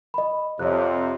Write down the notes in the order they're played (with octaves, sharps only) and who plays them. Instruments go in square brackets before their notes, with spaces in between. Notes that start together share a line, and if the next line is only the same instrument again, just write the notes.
[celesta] D#5 B5
[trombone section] F2 C3 [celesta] C#5 F#6